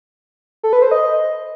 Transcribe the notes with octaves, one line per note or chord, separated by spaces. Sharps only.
A4
B4
C5
D#5